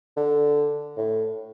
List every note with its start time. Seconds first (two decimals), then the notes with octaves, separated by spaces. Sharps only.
0.17 D3
0.97 A2